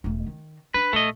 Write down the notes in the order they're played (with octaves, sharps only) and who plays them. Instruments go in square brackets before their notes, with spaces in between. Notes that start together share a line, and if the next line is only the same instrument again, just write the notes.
[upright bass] E1 A3
D#3
[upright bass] D4 [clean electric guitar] B4
[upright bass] A#1 [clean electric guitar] A3 D#5